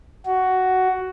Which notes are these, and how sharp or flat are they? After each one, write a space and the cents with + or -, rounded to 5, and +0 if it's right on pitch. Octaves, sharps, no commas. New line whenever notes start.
F#4 +10